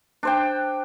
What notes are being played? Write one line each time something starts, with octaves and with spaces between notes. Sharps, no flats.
D4 C5 G5